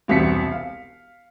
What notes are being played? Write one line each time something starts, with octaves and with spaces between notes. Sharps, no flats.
E1 C2 C4 B6 C#7
F5